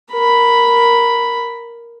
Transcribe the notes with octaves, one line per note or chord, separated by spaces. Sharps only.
A#4 B5